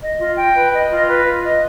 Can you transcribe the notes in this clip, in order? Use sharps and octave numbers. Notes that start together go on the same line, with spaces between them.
D#5
F4
G5
B4
D#5
F4
B4
F4
D#5